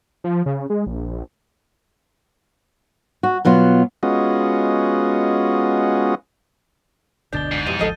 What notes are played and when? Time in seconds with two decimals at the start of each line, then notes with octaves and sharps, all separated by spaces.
0.24 F3
0.46 C#3
0.70 G#3
0.87 A#1
3.23 F#4
3.45 B2 F#3 B3 F4
4.03 G#3 B3 C#4 F4 F#4 D#5
7.33 F#1 D2 B2 D3 D4 G6 A6 G7
7.52 G#2
7.66 F2 B2 E3 G3 D#7
7.79 G#1 D2 F3 A4 D#5 F5